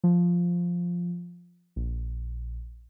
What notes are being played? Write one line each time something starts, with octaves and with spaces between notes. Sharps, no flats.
F3
A#1